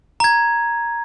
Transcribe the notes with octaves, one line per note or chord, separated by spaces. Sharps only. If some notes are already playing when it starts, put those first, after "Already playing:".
A#5 G#6